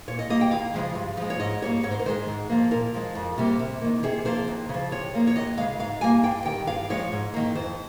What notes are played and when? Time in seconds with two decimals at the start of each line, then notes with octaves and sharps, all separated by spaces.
0.08 A#2 C#5
0.19 D#5
0.29 G3 A#3 D#5
0.41 G5
0.51 D#2 F5
0.74 C#3 F3 G#3
0.95 G2
1.17 F3 G#3
1.30 C#5
1.39 G#2 D#5
1.62 G3 A#3 C#5
1.83 G#2 C#5
1.91 C5
1.99 A#4
2.05 D#3 G#3 C5
2.28 G#2
2.50 F3 A#3
2.71 A#2 A#4
2.94 F3 G#3
3.15 F2
3.38 C3 G3 A#3
3.59 C3
3.81 D#3 A#3
4.03 C3 G#4
4.25 F3 A#3 C5
4.48 D#2
4.69 C#3 F3
4.91 C3 C#5
5.14 F3 A#3
5.27 C#5
5.36 D#2 D#5
5.57 C#3 G#3 F5
5.79 G#2 F5
6.01 G3 A#3 G#5
6.23 G2 G5
6.46 D#3 G3 G5
6.67 G2 F5
6.90 F3 G#3 C#5
7.12 G#2
7.34 D#3 A#3
7.55 F2 C5